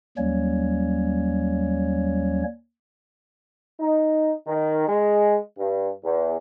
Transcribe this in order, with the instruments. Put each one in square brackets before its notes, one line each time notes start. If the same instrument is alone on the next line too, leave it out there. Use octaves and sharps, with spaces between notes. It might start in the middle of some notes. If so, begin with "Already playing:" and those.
[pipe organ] D#2 F#3 G3 A#3 C#4 C#5
[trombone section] D#4
D#3
G#3
G2
E2